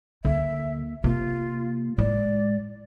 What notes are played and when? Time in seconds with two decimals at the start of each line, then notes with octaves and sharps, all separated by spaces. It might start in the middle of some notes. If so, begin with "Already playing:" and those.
0.25 D2 D3 A#3 E5
1.04 C3 A#3 F4
1.98 A2 G#3 D5